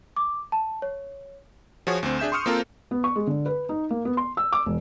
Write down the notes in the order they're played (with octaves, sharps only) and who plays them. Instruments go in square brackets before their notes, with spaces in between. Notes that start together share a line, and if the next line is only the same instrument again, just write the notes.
[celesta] D6
A5
C#5
[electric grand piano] F3 F4 F#4 G#4 C#5
D2 C4
D4 G#4 E5 G6 E7
C6 C#6 D#6 F6 C#7
A#3 C4 F4 A4 A#4 C5
[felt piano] B3
C#6
G#3
D3
B4
D#4
A#3
B3
C6
E6
D6
E1